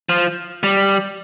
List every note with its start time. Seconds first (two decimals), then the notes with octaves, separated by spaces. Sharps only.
0.09 F3
0.63 G3